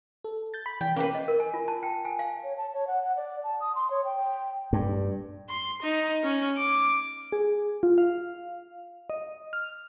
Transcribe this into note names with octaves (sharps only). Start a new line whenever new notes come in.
A4
G6 A6
B5
E3 G5
A#3 C#4 A#4 B4
D#5
A#4
G#5
F4
A5
G5
G#5
F5
C#5
A5
C#5
F#5
F#5
D5
A5
D#6
C6
C#5
G5
G2
C6
D#4
C#4
D6
G#4
F4
F5
D#5
F6